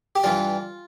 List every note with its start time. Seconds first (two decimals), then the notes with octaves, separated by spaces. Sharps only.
0.16 G4
0.24 G2 E3 G3 F4